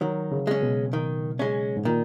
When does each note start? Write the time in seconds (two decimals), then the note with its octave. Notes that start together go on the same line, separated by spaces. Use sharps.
0.01 D#3 F#3
0.32 C#3
0.47 G#3 C#4
0.62 B2
0.93 D#3
1.39 G#3 C#4
1.77 G#2
1.85 A#2 D#3